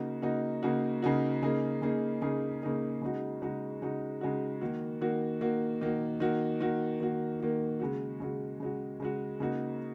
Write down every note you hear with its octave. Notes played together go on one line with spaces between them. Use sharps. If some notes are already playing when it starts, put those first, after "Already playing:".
Already playing: C#3 A#3 D#4 F#4
C#3 A#3 D#4 F#4
C#3 A#3 D#4 F#4
C#3 A#3 D#4 F#4
C#3 A#3 D#4 G#4
C#3 A#3 D#4 G#4
C#3 A#3 D#4 G#4
C#3 A#3 D#4 G#4
C#3 G#3 D#4 F#4
C#3 G#3 D#4 F#4
C#3 G#3 D#4 F#4
C#3 G#3 D#4 F#4
D#3 A#3 F#4
D#3 A#3 F#4
D#3 A#3 F#4
D#3 A#3 F#4
D#3 A#3 F#4
D#3 A#3 F#4
D#3 A#3 F#4
D#3 A#3 F#4
C#3 G#3 F#4
C#3 G#3 F#4
C#3 G#3 F#4
C#3 G#3 F#4
C#3 A#3 D#4 F#4